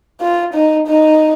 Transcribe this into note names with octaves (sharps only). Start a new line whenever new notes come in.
F4
D#4
D#4